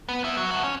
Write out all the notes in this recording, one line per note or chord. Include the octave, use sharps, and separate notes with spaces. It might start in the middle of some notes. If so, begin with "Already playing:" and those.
B3
B3 E4
F#3
A2 F#4
C#4